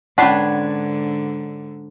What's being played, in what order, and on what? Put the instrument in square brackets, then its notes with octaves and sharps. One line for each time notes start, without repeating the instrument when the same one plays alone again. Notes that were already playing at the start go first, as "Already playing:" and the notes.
[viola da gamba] G#2 D3 [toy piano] C#4 F#5 [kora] D4 B4 C#5